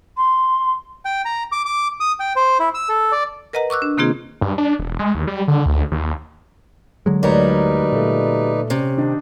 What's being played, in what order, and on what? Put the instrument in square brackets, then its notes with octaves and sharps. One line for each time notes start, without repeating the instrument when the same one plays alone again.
[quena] C6
[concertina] G5
A#5
D6
D6
D#6
G5
C5
E4
E6
A4
D5
[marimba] A#4 B4 D#5 F#5 A#5
C#6 D6 E6 F#6
D4
C3 D#3 A#3 C4 F4 G#4
[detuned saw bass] G2
D4
E1
G#3
D#2
G3
D3
D2
D#2
[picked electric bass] D3 F#3 G#3
[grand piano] D1 C#5 [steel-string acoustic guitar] G3 F#4 A#4 [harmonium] D#4 B4 D5
[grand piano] A#2 A3
[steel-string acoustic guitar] C3 [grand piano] C#4
[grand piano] D#3 D4 D#4